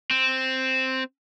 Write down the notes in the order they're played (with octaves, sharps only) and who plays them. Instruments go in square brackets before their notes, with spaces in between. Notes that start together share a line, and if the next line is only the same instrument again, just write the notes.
[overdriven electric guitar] C4